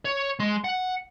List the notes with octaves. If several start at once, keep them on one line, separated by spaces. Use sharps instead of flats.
C#5
G#3 C6
F#5